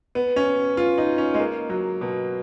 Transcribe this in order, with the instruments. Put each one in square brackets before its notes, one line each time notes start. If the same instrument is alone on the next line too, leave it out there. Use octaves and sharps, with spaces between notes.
[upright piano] B3
C#4
F4
D#4
C#4
G#3
A#3
F#3
B2